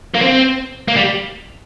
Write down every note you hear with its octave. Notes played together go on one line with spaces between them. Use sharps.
A#3
C4
A#3
G3